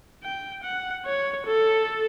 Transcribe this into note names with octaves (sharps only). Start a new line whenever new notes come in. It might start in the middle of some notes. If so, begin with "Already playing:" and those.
G5
F#5
C#5
A4